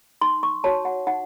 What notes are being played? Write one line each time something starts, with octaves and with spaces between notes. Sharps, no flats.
D#4 C6
C#6
F#4 C#5 A5
F#5
D#4 F#5